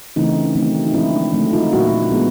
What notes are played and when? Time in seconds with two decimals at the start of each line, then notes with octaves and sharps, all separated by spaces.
0.16 C#3 E3 A3 C4 D#4
0.56 D#3 F#3 A3 C4
0.86 D#4
0.94 F3 G#3 C4 D4 E4
1.14 D4
1.33 D3 F#3 A3 C4
1.53 D#4 F4
1.72 A#2 F#3 A#3 D4 E4 F#4
2.11 F3 G#3 B3